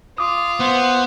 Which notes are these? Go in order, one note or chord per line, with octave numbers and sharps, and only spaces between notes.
F4 D6 D#6
B3 C5 F#5